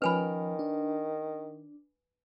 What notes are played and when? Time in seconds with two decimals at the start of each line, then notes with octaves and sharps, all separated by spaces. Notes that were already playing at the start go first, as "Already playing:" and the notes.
0.02 D#3 F3 C#4 B4 G#5 B5
0.59 D4